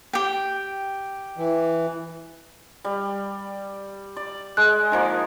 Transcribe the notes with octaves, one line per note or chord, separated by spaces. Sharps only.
G4 G5
E3
G3
D5
G#3 F#6
D#3 F3 A#3